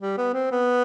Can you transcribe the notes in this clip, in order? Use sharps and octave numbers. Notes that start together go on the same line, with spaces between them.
G3
B3
C4
B3